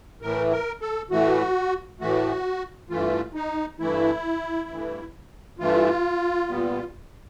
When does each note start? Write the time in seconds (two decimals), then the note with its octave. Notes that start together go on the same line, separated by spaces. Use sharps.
0.22 A2 E3 A3 A#4
0.51 A#4
0.81 A4
1.10 A2 E3 A3 F#4
2.00 A2 E3 A3 F#4
2.90 G2 E3 A3 F4
3.34 D#4
3.80 G2 E3 A3 E4
4.69 G2 E3 A3
5.59 G2 E3 A3 F4
6.48 A#2 G3 B3